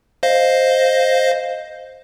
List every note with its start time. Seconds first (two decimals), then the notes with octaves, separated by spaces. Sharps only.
0.23 C5 D#5 F5